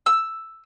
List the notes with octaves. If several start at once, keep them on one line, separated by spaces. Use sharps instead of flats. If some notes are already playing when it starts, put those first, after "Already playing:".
E6